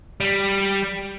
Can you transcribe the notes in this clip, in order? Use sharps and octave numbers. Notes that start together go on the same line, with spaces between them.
G3